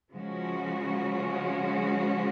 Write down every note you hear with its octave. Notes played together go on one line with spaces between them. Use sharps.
C#3 F3 G#3 C#4 F#4